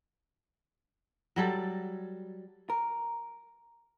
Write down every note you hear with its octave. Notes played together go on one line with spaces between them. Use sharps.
F#3 G3 A4
A#4